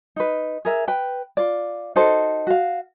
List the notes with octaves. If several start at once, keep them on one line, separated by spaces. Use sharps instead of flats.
D#4 B4
G#4 A#4 E5
B4 G5
F4 D5
D#4 F#4 A4 C5
F#4 F5